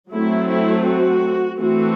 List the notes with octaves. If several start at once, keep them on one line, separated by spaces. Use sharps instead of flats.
F#3 A3 C4 E4
E4
F#4
E3 A3 C4 F#4